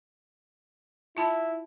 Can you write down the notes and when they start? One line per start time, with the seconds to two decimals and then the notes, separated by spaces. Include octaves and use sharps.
1.17 E4 F4 A5 B5